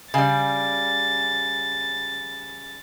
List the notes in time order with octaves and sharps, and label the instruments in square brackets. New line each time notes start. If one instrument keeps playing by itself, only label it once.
[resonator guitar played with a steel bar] C#3 G3 [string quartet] A6